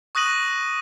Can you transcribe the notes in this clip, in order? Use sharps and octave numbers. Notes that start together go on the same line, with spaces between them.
C#6 D#6 F#6 A#6 D#7 F#7